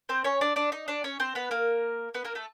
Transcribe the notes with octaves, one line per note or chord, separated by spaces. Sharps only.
C4 C5
C#4 C#5
D4 D5
D4 D5
D#4 D#5
D4 D5
C#4 C#5
C4 C5
B3 B4
A#3 A#4
B3 B4
A#3 A#4
A3 A4